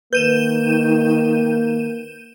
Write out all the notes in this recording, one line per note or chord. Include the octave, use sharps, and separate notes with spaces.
D#3 A#3 B4 G6 D#7 E7